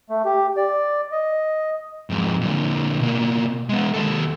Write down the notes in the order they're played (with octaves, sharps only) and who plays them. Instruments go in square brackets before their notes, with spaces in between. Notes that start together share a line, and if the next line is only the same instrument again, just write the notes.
[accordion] A3
G4
D5
D#5
[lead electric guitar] F2 G#2
A#2 D3
B2 A#3
G#3 B3
D#2 A4